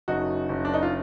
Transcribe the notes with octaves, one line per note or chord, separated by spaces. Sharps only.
F#1 D#4 F#4
F#1
D4
D#4
F4